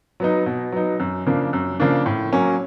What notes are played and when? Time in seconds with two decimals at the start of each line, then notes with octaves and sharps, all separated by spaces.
0.20 F#3 B3 D#4
0.46 B2
0.72 F#3 B3 D#4
1.00 F#2
1.26 C#3 F3 A#3 D4
1.53 F#2
1.80 C#3 F3 A#3 D4
2.06 A2
2.32 F#3 A#3 C#4